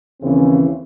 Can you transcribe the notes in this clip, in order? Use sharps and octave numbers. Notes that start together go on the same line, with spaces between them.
D#2 C#3 E3 C4